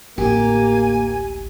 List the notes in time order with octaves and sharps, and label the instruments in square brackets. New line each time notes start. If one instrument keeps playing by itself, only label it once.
[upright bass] D1 A1 [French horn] A#3 [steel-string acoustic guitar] G4 [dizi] G#5